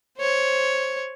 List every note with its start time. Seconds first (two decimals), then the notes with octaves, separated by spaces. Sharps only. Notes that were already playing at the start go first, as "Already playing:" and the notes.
0.18 C5 C#5